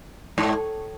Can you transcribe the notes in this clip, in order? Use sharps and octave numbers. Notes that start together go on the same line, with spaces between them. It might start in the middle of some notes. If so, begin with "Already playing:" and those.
G#2